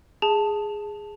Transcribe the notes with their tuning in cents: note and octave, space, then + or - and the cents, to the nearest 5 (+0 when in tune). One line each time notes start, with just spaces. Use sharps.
G#4 -5 A5 +0